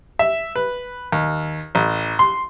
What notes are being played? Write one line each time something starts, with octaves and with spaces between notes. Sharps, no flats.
E5
B4
D#2
A1
C6